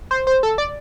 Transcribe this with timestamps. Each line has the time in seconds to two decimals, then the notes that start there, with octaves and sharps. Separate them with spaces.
0.11 C5
0.27 C5
0.43 A4
0.58 D5